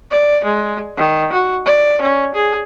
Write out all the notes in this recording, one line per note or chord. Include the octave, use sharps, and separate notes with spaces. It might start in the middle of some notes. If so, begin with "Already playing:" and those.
D5
G#3
D#3
F#4
D5
C#4
G#4